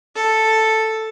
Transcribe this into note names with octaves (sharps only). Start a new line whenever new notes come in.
A4